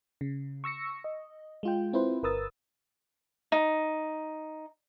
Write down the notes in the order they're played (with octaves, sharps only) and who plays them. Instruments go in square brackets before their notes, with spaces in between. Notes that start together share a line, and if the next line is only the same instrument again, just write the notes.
[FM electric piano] C#3
C#6 E6 A#6 C#7
D#5
G#3 F4 G5
C4 E4 F4 B4 C5
G1 A#4 B4 D#6 E6 A6
[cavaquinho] D#4